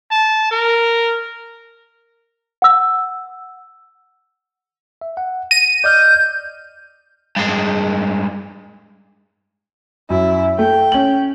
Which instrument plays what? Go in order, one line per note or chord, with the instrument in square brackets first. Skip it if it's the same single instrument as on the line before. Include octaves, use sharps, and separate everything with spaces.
[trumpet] A5
A#4
[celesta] F#5 E6
[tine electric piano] E5
F#5
[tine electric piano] A#6 [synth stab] D#7
[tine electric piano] D5 D#5 F6 [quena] G6
[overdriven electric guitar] G2 G#3
[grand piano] F#2 [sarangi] E4
[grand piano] A3 [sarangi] G5
[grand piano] C#4 F#7